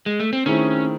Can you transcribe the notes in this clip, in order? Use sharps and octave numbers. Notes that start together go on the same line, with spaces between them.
G#3
A3
C4
D#3 A3 C4 C#4 E4 G#4